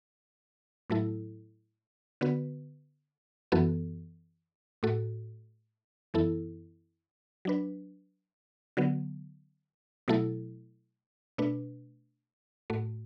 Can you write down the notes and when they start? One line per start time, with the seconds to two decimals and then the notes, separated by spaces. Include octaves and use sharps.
0.90 A2 F#3 A3 E4 A4
2.21 D3 B3 F#4 B4
3.52 F#2 E3 B3 F#4 A4
4.83 A2 A3 F#4 A4
6.14 F#2 E3 B3 E4 A4
7.45 F#3 D4 B4
8.77 D3 F#3 B3
10.08 B2 F#3 A3 E4 A4
11.38 B2 A3 D4 B4
12.70 A2 A3 F#4